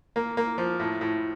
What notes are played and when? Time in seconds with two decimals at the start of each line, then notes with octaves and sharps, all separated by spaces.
0.16 A#3
0.37 A#3
0.58 F3
0.80 A2
1.01 A2